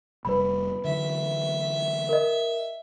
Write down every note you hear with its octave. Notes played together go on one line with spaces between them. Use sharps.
F1 C3 G3 B4 B5
D3 E3 F#3 E5
A#4 D#5